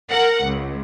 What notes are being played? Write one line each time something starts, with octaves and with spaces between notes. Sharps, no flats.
A#4 F#5
C#2